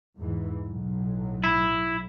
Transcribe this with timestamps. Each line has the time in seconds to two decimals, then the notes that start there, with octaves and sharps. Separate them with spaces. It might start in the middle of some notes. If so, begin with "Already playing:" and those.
0.16 E2 G#2 E3
0.64 B1 A2 F#3
1.44 E4